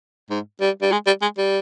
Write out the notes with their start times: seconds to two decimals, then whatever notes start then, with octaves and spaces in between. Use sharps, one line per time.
0.30 G#2
0.61 G3
0.82 G3
0.92 G#3
1.07 G3
1.22 G#3
1.37 G3